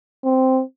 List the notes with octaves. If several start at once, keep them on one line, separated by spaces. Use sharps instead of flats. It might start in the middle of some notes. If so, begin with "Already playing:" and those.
C4